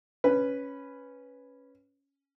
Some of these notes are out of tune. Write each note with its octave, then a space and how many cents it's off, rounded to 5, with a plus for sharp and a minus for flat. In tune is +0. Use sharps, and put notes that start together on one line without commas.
C#4 +0 B4 +0